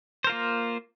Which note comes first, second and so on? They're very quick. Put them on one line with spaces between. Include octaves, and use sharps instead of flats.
C5 A#4 F4 A#3